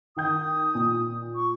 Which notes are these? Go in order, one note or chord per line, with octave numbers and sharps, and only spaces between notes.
D#3 G5 D#6 G6
A#2
C#6